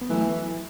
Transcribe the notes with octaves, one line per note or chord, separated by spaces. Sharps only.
B3
E3 F#3 A3